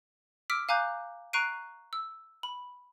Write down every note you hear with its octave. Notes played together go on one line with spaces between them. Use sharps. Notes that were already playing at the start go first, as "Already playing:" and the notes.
D6 E6 F6 B6 D7
F5 G#5 A#5 D6 F#6 G6
A#5 C#6 F#6 C7 D7 D#7
E6
B5